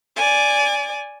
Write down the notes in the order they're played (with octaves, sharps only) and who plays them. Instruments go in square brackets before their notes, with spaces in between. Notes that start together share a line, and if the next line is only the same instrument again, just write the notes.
[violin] D5 G#5